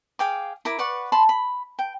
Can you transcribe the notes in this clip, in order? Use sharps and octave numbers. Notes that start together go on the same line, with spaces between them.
G#4 F5 G5 D6
E4 A#4 D6
B4 D5 F#5 C#6
A5 B5 C6
B5
G5